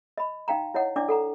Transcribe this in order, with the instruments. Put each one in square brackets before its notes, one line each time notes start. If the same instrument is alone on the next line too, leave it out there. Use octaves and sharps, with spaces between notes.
[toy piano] D#5 B5
D#4 F5 G5 A#5
E4 C#5 D#5 F#5
D4 E4 D5 D6
A4 F#5 A#5